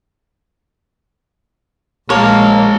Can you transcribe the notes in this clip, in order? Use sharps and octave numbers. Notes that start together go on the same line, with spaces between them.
A#1 G#3 A#3 A#4 C#5 A5